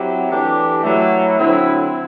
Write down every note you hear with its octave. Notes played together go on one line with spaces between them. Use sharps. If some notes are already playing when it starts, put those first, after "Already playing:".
Already playing: F#3 C4 E4 G4
E3 A3 D4 G4
F#3 A3 E4
D3 F#3 C4 E4